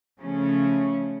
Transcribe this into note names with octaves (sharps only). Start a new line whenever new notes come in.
C#3 F3 A3 C#4